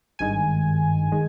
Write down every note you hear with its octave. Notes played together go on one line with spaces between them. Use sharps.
G#1 G2 D#3 G#3 G#5
D#3 G#3